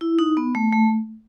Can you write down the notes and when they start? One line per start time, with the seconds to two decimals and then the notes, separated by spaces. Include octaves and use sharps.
0.01 E4
0.19 D#4
0.37 B3
0.55 A3
0.72 A3